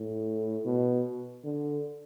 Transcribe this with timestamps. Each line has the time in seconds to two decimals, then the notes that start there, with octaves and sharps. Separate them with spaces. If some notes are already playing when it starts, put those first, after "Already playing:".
Already playing: A2
0.66 B2
1.44 D3